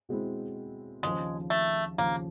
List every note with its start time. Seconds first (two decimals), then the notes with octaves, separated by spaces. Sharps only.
0.09 B2 G#3 C4 E4
1.03 D#2 C#3 F3 G#3
1.50 A3
1.98 D#2 C#3 F3 A#3